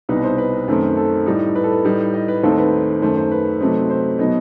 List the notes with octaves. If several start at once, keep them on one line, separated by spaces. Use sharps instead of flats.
C2 B2 G3 D#4 B4
C5
B4
F#2 D#3 A3 C4
A4
A2 G3 D#4
B4
A4
B4
A2 G3 D#4
D#5
B4
D#2 D#3 A3 C4 D#4 A4
B4
F#2 D#3 A3 C5
C5
B4
C3 F#3 A3 C4 D#4
C5
B2 F#3 B3 D#4 D#5